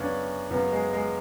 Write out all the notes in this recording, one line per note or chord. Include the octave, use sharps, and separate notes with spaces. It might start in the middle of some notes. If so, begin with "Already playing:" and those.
Already playing: F#2 C#3 B3 C#4 D4
F#2 C#3 B3
G#3
G#3